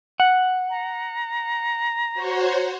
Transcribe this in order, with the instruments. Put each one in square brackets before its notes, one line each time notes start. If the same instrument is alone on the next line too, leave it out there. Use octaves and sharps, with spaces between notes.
[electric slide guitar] F#5
[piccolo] A#5
[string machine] F#4 C5 C#5